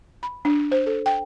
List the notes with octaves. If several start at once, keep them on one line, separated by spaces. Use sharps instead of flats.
B5
D4
C5
A4
G5